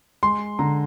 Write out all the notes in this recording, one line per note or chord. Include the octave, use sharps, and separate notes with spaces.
G#3 C6
D3 A#5